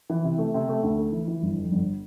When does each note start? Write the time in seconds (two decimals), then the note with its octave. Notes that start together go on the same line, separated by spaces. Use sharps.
0.10 E3
0.24 C3
0.38 A3
0.54 C3
0.69 A3
0.83 D2
0.98 A3
1.12 E3
1.28 E3
1.43 G1
1.56 F2
1.71 G1